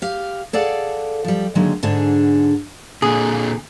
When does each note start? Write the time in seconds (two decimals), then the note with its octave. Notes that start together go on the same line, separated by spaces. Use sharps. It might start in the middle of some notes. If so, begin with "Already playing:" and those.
0.02 G4 F5
0.53 G#4 A4 D5 F5 F#5
1.24 F3 G3
1.55 D3 D#3 F#3 G#3 A#3
1.83 G#2 D3 D4 G#4
3.02 A#2 D3 G#4